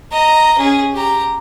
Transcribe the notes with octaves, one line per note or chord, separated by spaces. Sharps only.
D#5 A#5
C#4 G#4
G4 A#5